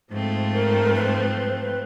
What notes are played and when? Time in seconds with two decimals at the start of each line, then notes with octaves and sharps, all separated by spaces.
0.11 G#2 F3 A3 C4
0.53 A#4
0.95 B4
1.05 C5
1.17 B4
1.28 C5
1.39 B4
1.51 C5
1.62 B4